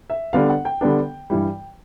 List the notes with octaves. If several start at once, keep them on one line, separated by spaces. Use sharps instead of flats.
E5
D3 G3 B3 D4 F5
F#5
G5
D3 G3 B3 D4
G2 E3 G3